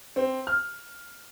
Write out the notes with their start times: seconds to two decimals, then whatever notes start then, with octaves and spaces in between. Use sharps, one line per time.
0.16 C4
0.47 F6